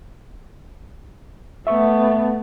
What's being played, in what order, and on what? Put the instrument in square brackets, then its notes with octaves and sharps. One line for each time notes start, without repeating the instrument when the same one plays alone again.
[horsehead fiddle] A3 B3 [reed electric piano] E5 C#6